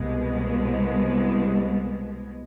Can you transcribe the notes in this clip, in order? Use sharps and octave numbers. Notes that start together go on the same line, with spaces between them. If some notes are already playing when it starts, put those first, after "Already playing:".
Already playing: C2 B2 G#3